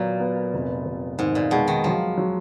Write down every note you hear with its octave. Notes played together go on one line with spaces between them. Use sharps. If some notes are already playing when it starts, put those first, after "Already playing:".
Already playing: A#2 F#3 B3
B3
F1
F1
G#2 D#3
A#2
B2 G#3
D#3
F3 F#3
F#3